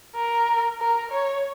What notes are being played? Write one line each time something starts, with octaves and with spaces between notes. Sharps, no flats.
A#4
A#4
C#5